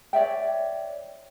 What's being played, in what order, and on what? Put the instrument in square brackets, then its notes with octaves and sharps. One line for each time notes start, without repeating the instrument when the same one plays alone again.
[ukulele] C#5 D5 E5 G5